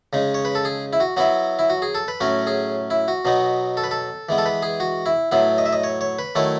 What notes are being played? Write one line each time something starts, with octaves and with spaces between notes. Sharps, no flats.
C#3 G#3 D#4
C#5
B4
A4
G#4
E4
F#4
F#3 B3 E4 F#4
E4
F#4
G#4
A4
B4
A2 F#3 C#4 F#4
G#4
E4
F#4
B2 F#3 B3 D#4
A4
B4
A4
E3 G#3 B3
A4
B4
G#4
F#4
E4
A2 F#3 B3 E4
D#5
E5
D#5
C#5
C#5
B4
D#3 F#3 A3 E4 C#5